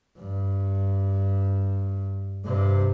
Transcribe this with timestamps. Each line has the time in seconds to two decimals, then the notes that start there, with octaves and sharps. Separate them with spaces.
0.18 G2
2.45 G2 C3